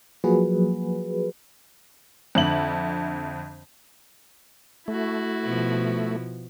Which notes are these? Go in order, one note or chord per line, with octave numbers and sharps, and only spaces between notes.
F3 F#3 A#3 F#4 G#4 B4
F2 D3 E5 F#7
A3 E4 F#4
B2 F3